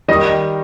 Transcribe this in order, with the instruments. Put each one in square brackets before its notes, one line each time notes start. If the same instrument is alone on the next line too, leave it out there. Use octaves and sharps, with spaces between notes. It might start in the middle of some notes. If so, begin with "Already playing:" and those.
[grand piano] D#3 G3 D#5